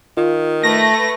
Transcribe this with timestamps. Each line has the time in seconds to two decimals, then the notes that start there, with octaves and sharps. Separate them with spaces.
0.17 D#3 F4
0.63 A3 B4 A#6